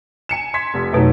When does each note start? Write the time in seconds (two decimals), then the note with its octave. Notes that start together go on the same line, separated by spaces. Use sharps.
0.29 G#5 C#7 E7
0.54 C6 G#6 B6
0.74 F1
0.93 F2 B2 F#3 A3 D#4